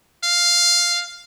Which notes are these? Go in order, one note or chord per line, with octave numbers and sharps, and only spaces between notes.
F5